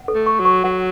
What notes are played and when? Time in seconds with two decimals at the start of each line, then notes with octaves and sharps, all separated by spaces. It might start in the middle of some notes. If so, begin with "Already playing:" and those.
Already playing: F#5
0.08 A4
0.14 A3
0.26 C#6
0.40 F#3
0.45 C#6
0.64 F#3 F#5